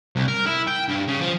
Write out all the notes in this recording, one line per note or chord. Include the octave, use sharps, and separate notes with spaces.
C2
A#4
E4
G5
G2
C#3
F3